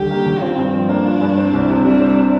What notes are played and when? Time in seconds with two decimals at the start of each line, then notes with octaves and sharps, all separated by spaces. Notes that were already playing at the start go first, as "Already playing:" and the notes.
Already playing: D#2 D3 G3 G4
0.10 A#3
0.26 D#2
0.41 C4 F4
0.58 G2
0.73 F3
0.89 A#3 D4
1.05 F4
1.21 G2
1.37 C4
1.53 C2
1.69 C3
1.84 G3 D4
2.00 C4